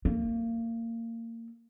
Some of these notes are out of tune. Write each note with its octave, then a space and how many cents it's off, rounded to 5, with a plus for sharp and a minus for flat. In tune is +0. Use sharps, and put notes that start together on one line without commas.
A#3 -25